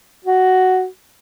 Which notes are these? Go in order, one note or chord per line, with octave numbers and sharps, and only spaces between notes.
F#4